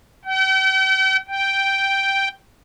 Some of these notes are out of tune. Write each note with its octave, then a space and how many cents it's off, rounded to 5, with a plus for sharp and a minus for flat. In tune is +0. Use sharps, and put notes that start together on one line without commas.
G5 -45
G5 -5